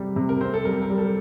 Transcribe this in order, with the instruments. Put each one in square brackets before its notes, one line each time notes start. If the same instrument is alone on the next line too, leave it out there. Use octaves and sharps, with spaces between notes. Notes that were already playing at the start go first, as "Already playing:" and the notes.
Already playing: [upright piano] C3 G3
C3
[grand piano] A#4
[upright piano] C4 [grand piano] C5
[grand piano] A4
[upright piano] G3 [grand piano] A#4
[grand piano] A#4
[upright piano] G3
[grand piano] A4